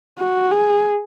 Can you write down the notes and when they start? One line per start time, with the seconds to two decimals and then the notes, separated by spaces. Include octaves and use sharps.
0.19 F#4
0.51 G#4